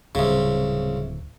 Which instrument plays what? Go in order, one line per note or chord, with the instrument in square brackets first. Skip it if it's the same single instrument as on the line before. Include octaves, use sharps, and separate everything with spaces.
[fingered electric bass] D1 [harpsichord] C2 C#3